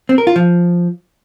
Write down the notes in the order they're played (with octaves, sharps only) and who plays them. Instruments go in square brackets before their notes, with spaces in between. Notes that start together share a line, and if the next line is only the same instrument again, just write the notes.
[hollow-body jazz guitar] C4
A#4
F4
F3